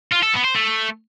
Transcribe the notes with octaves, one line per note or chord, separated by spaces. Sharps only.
F4
A4
B3
C5
A3